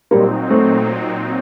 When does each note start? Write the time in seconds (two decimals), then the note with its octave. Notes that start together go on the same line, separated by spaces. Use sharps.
0.11 A#2 F#3 G3 A#3 C4 D#4
0.51 A3 C4